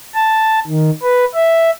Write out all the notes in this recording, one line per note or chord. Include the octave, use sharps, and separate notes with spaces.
A5
D#3
B4
E5